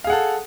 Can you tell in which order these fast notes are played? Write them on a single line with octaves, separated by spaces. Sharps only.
F5 G#4 F#5 A4